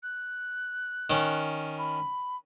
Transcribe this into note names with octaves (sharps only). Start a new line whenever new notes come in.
F#6
D#3 C#4
B5